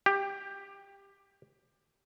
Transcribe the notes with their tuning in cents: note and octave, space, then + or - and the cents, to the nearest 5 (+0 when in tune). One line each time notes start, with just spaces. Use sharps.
G4 +10